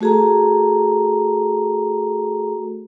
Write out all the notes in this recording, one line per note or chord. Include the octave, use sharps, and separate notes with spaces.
A3 F#4 G#4 A4 A#5